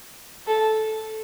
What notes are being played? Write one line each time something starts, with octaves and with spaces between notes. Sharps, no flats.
A4